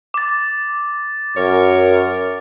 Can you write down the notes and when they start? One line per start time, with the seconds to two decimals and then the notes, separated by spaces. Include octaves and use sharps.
0.14 D6 A6
1.37 F#2 A#4 C#5